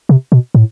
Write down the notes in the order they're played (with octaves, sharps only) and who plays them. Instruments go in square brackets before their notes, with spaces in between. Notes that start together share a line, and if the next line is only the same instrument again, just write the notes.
[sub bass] C3
B2
A2